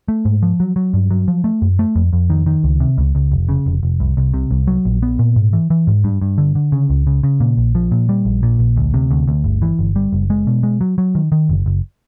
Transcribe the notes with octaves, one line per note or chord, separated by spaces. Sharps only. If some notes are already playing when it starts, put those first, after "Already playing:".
A3
G#2
F3
F#3
F#3
G2
F#3
F3
A3
F#2
A3
F2
F2
D#3
D#3
C#2
C3
C#2
C#2
F1
C#3
F1
F1
C2
C2
C3
C2
F#3
A#1
B3
A#2
G#2
E3
E3
G#2
G2
G2
D3
D3
C#3
C#2
C#3
C#3
A#2
A#1
F3
A#2
G3
A#1
A#2
A#1
D2
C3
D2
D2
G1
E3
G1
G3
F#1
G#3
B2
G#3
F#3
F#3
D#3
D#3
F#1
F#1